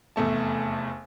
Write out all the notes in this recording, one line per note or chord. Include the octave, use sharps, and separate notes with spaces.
F1 E2 A3 A5